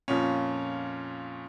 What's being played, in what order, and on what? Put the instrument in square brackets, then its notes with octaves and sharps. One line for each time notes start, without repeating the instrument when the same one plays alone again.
[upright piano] F2 A#2 C#4